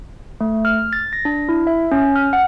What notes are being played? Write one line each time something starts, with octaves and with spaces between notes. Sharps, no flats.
A3
F6
A6
A#6
D4
E4
E5
C#4
F6
F#5